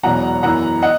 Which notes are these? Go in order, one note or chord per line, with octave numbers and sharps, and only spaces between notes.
E1 E2 B2 F#3 F#5 A#5
F#2 E3 B3 F#5 A#5
D#5 F#5